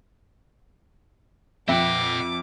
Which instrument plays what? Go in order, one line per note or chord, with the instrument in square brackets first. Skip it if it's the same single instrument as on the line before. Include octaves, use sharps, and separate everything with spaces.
[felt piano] F2 [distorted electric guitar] D#5 F#5 [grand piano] E5 G5 [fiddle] D6